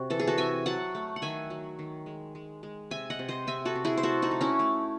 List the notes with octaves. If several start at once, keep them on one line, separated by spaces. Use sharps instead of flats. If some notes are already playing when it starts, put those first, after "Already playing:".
Already playing: C3 F#4
E3 A4
G#4
F#4 A4
C3 E5 G#5
F#3 F#5 A5
A3
F#5
D#3 E5 G#5
F#3
D#3
G#3
G#3
G#3
C3 E5 G#5
D#5 F#5
C3
C5 D#5
C3 E5 G#5
F#4 A4
C3
E4 G#4
C5
A3 F#4 A4
D#4 F#4
A3
C#4 E4
A3